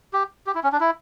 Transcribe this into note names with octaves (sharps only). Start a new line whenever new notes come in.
G4
G4
E4
C#4
D4
E4